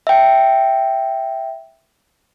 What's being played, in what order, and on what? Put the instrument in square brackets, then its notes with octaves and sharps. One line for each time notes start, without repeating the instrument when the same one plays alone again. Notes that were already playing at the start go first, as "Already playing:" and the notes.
[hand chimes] E5 G5